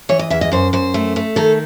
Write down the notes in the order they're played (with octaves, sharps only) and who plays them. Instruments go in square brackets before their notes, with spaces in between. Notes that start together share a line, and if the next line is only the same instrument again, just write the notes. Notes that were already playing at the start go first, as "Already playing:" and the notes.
[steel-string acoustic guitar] E3 C#5
D#5
E2 E5
D#5
F#2 C5
F#2 C5
A3
A3
D#3 A4